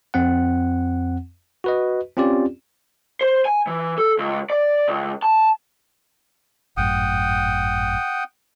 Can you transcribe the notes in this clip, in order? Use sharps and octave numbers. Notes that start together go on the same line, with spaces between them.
F2 C4 F#5
F#4 B4 D#5
C4 C#4 F4 G4 D5
C5
G#5
E3
A4
C#2
D5
C#2
A5
G#1 F#2 A2 F#5 G5 D#6